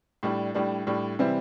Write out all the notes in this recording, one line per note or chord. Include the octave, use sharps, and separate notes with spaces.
A2 G3 D4
A2 G3 D4
A2 G3 D4
C3 E3 G3 C4 E4